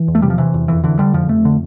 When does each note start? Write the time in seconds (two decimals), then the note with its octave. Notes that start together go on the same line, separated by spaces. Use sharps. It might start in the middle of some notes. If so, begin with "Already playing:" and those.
Already playing: E3
0.08 E2
0.15 A3
0.22 C3 G3
0.30 F3
0.38 C3 E3
0.54 E2
0.68 F2 E3
0.84 D3 E3
0.98 D3 G3
1.14 F2 F3
1.29 F2 A3
1.45 D3